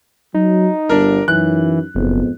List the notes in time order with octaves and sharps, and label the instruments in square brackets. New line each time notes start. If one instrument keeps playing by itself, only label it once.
[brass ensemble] F#3 [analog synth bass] D#4
[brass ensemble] G1 [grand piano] D4 A#4
[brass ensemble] F#2 D#4 [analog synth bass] E3 [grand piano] F#6
[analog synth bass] F#1 [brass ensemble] F2 G#2 B3